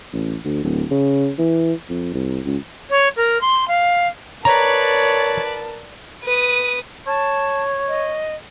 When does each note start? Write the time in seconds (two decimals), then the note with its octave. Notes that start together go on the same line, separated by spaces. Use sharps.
0.13 A1
0.45 D2
0.64 D1
0.91 C#3
1.38 E3
1.89 F2
2.14 C2
2.46 C#2
2.90 C#5
3.17 A#4
3.41 C6
3.68 F5
4.45 A#4 B4 C#5 D5 A5 A#5
6.23 B4 D#6
7.07 C#5 A5
7.88 D#5